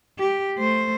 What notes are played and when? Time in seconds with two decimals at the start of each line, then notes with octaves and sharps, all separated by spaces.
0.19 G4
0.58 A3 C5